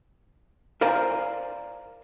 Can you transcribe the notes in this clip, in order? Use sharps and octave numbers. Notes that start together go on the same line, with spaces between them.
A#4 C5 D5 F5 G#5 A#5